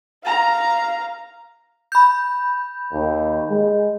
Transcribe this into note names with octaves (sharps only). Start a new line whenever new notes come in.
F5 A#5
B5 G6
D#2
G#3